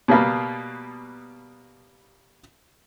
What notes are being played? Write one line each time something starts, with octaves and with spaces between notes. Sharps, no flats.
B2 G3 A#3 B3